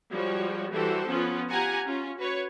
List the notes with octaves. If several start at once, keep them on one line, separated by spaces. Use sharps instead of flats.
F3 G3 G#3 F#4 C#5
E3 G3 F#4 G4 A4 C5
F3 B3 C#4 F4
F4 G4 F#5 G#5 A#5
C#4 F4
F#4 B4 C#5